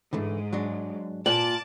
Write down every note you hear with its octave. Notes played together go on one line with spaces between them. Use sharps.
G#2 D3 E3 A3
F#3 G#3 D4
A#2 D5 A5 D6 F#7